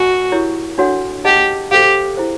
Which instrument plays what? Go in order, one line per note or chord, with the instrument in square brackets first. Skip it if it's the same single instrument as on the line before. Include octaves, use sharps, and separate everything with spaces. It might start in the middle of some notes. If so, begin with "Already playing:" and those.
Already playing: [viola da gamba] F#4 [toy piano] A#4 D#5 G#5 B5
[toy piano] E4 G4 A#4 C#5
D4 F#4 A4 C#5 F#5
[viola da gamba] G4 [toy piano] G#4 B4 D#5 F#5 A5
[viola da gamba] G4 [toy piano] A4 C5 F5
[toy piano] E4 G#4 C5